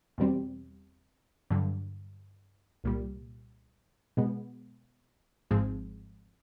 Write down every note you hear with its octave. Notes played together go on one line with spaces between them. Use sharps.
E2 B2 G3 C4
G2 D3 F#3
C2 A#2 G3
B2 G#3 B3
G#1 G#2 F3 G#3 C4